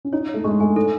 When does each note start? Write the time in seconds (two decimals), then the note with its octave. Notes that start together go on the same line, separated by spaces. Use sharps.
0.05 C#4
0.13 D#4 C#5
0.29 C#5
0.34 A3
0.44 G#3 C#6
0.60 A3 G#5
0.76 D#4 A4